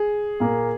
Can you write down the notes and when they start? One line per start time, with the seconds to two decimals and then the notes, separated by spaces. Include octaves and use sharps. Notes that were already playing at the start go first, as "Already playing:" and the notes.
Already playing: G#4
0.40 A#2 A#3